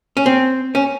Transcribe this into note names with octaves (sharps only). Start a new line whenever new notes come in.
C#4
C4
C#4